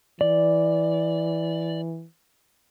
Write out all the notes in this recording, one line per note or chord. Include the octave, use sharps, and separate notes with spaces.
E3 D5